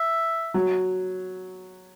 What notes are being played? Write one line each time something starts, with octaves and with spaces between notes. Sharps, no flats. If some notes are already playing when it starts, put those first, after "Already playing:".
Already playing: E5
F#3